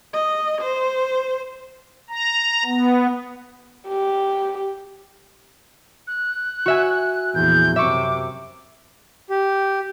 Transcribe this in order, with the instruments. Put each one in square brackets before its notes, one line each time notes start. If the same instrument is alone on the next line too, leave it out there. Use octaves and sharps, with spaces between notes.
[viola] D#5
C5
[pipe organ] A#5
B3
[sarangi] G4
[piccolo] F#6
[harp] F#4 E5 G#5
[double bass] A#1 E2 [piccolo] G6
[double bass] F#2 C3 [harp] E5 C#6 [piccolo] D6
[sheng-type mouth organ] G4